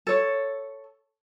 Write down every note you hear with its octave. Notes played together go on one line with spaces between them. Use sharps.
A4 C#5